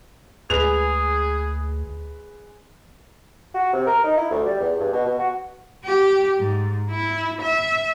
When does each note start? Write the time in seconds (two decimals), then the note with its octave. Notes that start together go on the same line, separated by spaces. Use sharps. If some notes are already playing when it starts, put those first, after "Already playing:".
0.50 D2 G#3 G#4 B4 F7
3.54 F#4
3.73 C3
3.87 A#4
4.04 D#4
4.17 E4
4.31 D2
4.46 G3
4.60 E2
4.80 G2
4.93 B2
5.06 B2
5.19 F#4
5.85 G4
6.39 G#2
6.90 E4
7.42 E5